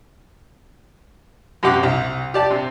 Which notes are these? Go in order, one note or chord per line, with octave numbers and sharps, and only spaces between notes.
F#2 C3 G4 F#5 D6
C2
G4 D5 A5
C3